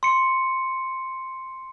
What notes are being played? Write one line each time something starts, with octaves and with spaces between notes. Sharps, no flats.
C6 C#7